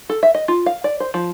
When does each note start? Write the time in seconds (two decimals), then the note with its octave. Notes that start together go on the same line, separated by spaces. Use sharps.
0.10 A4
0.23 E5
0.35 D#5
0.48 F4
0.66 F5
0.84 D5
1.00 C5
1.14 F3